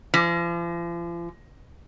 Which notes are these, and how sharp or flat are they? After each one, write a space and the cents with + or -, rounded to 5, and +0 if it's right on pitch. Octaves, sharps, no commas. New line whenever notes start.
F3 -40